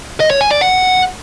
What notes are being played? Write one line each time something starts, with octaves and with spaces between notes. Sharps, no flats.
D#5
C#5
G#5
D5
F#5